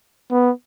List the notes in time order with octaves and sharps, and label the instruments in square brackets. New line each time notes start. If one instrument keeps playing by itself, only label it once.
[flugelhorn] B3